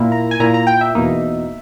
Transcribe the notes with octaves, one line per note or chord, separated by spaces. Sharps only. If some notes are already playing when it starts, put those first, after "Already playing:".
Already playing: A#2 A#3 E4
A#5
G#5
A#2 A#3 E4 A#5
A#5
G5
E5
E2 B2 A#3 D#4